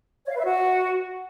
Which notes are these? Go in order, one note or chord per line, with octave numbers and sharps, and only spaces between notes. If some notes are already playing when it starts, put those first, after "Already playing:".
C#5
F5
B4
E5
F#4